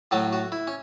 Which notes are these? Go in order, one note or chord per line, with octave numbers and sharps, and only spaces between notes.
A2 F#3 A3 F#4
F#4
E4
C#4